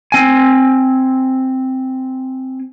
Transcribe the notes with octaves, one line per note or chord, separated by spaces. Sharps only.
C4 G#5